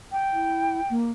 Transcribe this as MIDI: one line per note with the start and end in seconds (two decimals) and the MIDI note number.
0.12 0.94 79
0.33 0.81 64
0.90 1.11 58